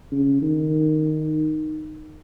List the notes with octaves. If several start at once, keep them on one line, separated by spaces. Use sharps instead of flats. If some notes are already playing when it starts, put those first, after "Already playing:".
C#3
D#3